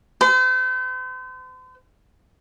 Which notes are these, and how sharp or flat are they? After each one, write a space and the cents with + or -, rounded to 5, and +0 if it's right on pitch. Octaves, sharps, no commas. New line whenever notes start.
C5 -40